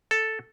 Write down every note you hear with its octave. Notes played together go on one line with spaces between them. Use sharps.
A4